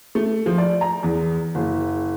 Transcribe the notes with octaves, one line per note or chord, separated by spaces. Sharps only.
A3
F3
D5
A#5
E2
F#1